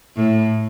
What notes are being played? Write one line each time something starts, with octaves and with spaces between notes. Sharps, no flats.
A2